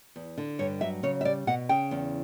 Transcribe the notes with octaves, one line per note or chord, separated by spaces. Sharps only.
E2
D3
G2 C#5
F#3 E5
C#3 C#5
E5
G3 D5
B2 F#5
C#3 G5
E2